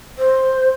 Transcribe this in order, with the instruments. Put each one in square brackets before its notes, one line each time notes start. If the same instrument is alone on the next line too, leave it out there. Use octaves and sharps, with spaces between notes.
[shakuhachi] C5